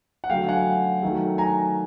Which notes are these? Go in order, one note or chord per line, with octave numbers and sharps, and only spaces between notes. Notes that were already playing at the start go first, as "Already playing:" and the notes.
F#5
D3 F#3 A3 F5 G5
F#5 G#5
D#3 F#3 A3
G#5 A#5